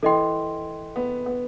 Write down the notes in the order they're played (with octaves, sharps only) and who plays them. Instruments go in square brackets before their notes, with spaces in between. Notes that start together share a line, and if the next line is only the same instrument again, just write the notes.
[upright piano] E3 [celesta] A4 D#5 G5 C6
[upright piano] B3
B3